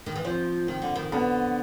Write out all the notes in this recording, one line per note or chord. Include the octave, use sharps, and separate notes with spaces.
D#3
E3
F3 C4
D#3
D3
D#3
D3 B3